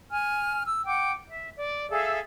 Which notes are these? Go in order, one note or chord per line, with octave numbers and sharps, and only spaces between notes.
G#5 F6
E6
F#5 G5 D6
E5
D5
G#4 A4 E5 F5